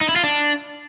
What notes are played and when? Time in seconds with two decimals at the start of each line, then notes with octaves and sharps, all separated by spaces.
0.01 D#4
0.09 E4
0.16 F4
0.24 D4